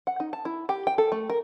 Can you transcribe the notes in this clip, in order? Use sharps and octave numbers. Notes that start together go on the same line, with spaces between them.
F#5
D#4
A5
E4
G4
G5
A4
A3
A#4